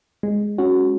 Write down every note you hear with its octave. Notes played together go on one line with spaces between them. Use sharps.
G#3
C#4 F#4